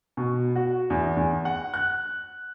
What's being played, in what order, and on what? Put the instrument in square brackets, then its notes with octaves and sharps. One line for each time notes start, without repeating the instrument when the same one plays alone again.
[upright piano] B2
F#4
E2
E2
F#5
F#6